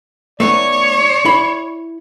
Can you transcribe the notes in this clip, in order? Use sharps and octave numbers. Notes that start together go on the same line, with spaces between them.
A3 B3 D#4 C#5 D5
E4 B5